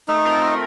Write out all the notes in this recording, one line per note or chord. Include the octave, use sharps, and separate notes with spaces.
A3 D#4
C4 F4 A#4
A3